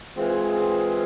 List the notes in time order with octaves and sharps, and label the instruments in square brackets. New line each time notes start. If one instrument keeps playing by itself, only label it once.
[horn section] E3 G#3 C4 F4 G#4